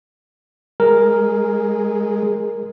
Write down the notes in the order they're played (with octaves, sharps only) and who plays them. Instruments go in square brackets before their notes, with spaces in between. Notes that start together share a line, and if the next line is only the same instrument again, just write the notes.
[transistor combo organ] G#3 [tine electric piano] A#4